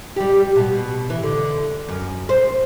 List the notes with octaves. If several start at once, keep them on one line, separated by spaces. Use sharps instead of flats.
G3 G4
B2
E3
D3
F#2
C5